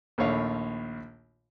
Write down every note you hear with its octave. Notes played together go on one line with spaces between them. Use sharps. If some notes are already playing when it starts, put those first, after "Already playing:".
A#1 D#2 A3 C#5 F5 B5